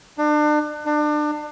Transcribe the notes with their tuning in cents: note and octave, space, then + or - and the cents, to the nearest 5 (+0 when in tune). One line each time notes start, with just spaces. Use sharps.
D4 +35
D4 +30